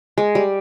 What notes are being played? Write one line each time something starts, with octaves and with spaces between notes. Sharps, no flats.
G#3
G3